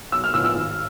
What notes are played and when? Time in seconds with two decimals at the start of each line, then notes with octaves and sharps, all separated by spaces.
0.12 B1 E6
0.24 F6
0.34 A2 F3 B3 E6
0.44 E6
0.55 G#1